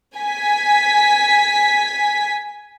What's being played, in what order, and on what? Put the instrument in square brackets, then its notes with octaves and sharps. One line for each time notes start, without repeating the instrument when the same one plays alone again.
[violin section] G#5 B6